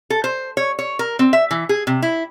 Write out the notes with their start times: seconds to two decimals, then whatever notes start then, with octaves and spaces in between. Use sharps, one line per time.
0.10 A4
0.24 C5
0.57 C#5
0.79 C#5
0.99 A#4
1.19 C4
1.33 E5
1.51 E3
1.69 G#4
1.87 C3
2.02 E4